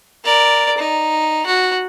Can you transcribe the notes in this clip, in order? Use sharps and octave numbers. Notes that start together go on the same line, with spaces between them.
A#4 D5
D#4
F#4